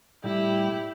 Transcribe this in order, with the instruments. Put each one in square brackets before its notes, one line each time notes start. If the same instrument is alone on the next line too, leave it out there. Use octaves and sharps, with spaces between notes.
[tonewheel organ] A2 G3 [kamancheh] E4 G4